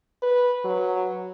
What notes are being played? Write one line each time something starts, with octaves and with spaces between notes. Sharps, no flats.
B4
F#3